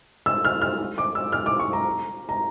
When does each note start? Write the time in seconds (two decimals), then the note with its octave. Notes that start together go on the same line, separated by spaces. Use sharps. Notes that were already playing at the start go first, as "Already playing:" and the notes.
0.26 E6
0.45 F6
0.62 F6
0.98 D6
1.15 E6
1.32 F6
1.46 D6
1.60 C#6
1.73 A#5
2.29 A#5